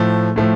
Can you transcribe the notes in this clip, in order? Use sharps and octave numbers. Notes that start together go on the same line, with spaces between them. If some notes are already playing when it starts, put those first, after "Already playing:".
Already playing: A2 F3 A3
A2 F3 A3